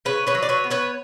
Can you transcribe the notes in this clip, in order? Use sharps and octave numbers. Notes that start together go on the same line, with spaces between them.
C#3 B4 C#5
B4 C#5
F#3
D5
B4 C#5
B3
B4 C#5